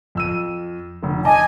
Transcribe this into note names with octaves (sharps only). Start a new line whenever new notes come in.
F2 E6 D#7
F1 D3
D#5 G#5 A5 D6